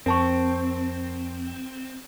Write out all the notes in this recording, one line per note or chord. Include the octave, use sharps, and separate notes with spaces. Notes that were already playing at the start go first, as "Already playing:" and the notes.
F2 C4 A#4 A5 C#6